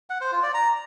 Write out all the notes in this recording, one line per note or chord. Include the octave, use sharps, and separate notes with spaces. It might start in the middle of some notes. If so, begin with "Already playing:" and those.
F#5
C5
F4
D5
A#5